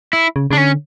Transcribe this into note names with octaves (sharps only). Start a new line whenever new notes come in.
E4
C#3
C#3 D4
D3 C#4